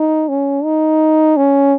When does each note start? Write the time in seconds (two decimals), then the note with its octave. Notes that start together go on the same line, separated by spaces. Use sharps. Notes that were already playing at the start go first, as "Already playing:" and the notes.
Already playing: D#4
0.29 C#4
0.64 D#4
1.37 C#4